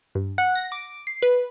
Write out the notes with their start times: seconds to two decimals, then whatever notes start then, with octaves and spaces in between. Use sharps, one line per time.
0.15 G2
0.38 F#5
0.55 A#6
0.72 D6
1.07 C7
1.22 B4